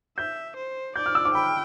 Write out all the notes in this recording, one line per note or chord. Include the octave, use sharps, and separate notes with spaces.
E5 G6
C5
D5 G6
F6
E6
D6
G5 B5